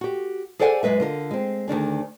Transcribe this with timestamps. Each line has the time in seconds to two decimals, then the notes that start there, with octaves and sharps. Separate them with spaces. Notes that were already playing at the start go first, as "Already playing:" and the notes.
0.01 F#4 G4
0.59 G#4 A4 C5 D5 F#5 G#5
0.83 F#2 C3 G#3 B4 E5
1.00 D3 F4 A#4
1.31 G#3 C4
1.68 D2 D#3 D4 G#4